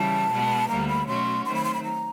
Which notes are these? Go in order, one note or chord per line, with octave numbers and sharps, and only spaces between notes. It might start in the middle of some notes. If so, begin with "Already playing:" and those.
Already playing: C#3 E3 G3 A5
B2 G#3 B3
D2 D3 G3 A#3 A#5
B5
B2 F#3 A3 C#4 F#4 C6
D#3 F#3 A3 C4 C6
B5
C6
B5
A#5